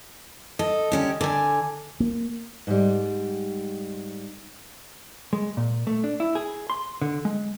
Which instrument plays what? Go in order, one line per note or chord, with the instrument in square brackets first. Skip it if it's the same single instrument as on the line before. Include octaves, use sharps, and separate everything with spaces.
[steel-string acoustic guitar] A4 [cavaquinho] D#5
[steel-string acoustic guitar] D3 C#4 G4
[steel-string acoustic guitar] D3 [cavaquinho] D5 G#5
[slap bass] A#3
[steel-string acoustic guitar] G#2 G3
[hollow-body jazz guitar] G#3
A#2
A3
D4
E4
G#4
C6
D3
G#3